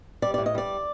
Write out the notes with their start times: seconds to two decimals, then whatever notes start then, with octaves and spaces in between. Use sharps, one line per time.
0.22 G3 D5
0.34 A2 D5
0.46 D#5
0.55 G3 D5